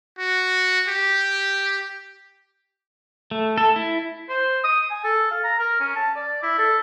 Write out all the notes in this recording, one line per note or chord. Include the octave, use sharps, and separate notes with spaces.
F#4
G4
A3
A4
E4
C5
D#6
G#5
A4
F5
A#5
A#4
C#4
A5
D5
E4
A4